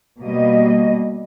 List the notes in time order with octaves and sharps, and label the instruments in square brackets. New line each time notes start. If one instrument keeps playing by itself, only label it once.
[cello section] B2 G3 A#3 D#5